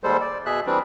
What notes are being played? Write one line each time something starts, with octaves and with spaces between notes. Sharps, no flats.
D#2 G3 G#3 A4 C5
D5
B2 G#4 E5 F#6
E3 G3 C4 D4